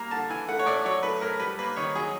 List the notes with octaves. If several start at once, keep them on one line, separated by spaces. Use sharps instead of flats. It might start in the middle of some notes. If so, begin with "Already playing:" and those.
Already playing: G3 A#3 A#5
D3 A5
E3 G#5
A3 F#5
C#5
A2 D5
F#3 C#5
A3 B4
A2 A#4
G3 B4
A#3 B4
D#3 C#5
F#3 G#4